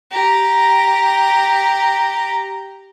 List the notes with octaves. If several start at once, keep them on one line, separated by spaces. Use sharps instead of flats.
G4 A#5